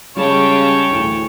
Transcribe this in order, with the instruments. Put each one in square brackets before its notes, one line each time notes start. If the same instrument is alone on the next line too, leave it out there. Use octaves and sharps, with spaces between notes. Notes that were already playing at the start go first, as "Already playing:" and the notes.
[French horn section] C#3 [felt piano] G3 G#3 [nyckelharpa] C#5 [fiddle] G5 A5
[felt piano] D2 A2 E3